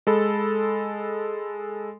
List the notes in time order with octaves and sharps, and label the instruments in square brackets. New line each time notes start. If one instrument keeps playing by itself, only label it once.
[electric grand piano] G#3 A4 B5